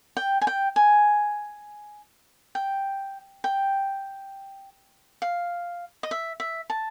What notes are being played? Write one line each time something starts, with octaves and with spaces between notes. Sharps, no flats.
G5
G#5
G5
G#5
G5
G5
F5
D#5
E5
E5
A5